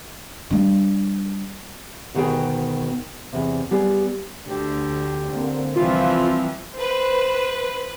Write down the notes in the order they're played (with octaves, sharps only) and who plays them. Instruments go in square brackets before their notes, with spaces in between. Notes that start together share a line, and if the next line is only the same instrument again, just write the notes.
[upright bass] G3 D4
[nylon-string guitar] D2 B2 D#3 B3 G#4 G5
E2 C3
G3 B3 G#4
[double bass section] D2 [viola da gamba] D3 [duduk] G4
[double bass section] D3 A#3 C4
[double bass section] C2 [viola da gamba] E3 F3 [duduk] C4 [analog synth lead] F4
[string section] B4 [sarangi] C5